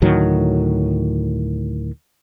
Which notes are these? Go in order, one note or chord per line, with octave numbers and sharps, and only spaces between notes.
D2 A2 D#3 F#3